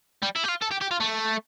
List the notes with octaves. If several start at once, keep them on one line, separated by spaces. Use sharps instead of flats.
G3
E4
G4
F4
A4
G4
G4
F4
A3